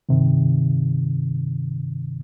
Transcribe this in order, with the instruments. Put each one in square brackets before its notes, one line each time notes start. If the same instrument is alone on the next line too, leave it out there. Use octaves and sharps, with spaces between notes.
[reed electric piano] G2 C3 D#3